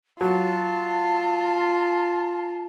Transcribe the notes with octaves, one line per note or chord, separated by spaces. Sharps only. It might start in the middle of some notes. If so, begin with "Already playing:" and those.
F#3 F4 A5